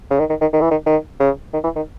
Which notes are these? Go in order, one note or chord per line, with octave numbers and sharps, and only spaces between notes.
C#3
D#3
D#3
D#3
D#3
E3
D#3
D#3
C#3
D#3
E3
D#3